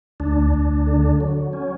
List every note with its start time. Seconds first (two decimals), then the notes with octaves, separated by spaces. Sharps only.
0.20 D2 D4
0.54 D2
0.87 D3
1.20 F#3
1.53 C#4